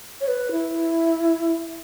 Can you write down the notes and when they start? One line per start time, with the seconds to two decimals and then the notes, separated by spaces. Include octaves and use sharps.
0.21 C#5
0.28 B4
0.52 E4